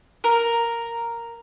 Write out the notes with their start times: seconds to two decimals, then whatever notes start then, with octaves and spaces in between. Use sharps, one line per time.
0.24 A#4